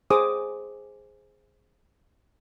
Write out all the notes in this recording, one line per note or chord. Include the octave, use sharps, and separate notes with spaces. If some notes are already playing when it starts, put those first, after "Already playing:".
G#4 C5 D6 D#6